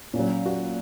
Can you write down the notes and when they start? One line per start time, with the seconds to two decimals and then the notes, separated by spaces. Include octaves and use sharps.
0.13 A#2 C#4
0.19 F#3
0.46 F#4